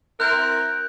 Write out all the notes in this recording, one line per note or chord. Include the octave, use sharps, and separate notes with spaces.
C4 E4 A#4 F#6 G6